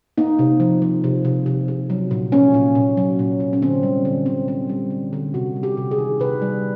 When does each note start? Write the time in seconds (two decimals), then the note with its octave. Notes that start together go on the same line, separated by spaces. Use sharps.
0.18 A#3 D#4
0.39 C3
0.60 F3
0.82 F3
1.04 C3
1.25 C3
1.46 C3
1.68 C3
1.90 F#3
2.11 A#2
2.32 A#3 C#4
2.54 A#2
2.75 A#2
2.97 F#3
3.19 A#2
3.40 A#2
3.53 C#4
3.62 D3 C4
3.83 G3
4.05 D3
4.26 C4
4.48 C4
4.69 G3
4.90 D3
5.13 D3
5.34 C3 F#4
5.56 G3
5.63 G4
5.77 C3
5.91 G#4
5.98 D#3
6.20 C3 B4
6.42 G3